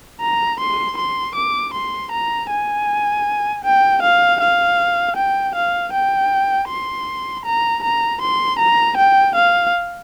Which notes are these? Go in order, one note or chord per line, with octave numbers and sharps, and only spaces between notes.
A#5
C6
C6
D6
C6
A#5
G#5
G5
F5
F5
G5
F5
G5
C6
A#5
A#5
C6
A#5
G5
F5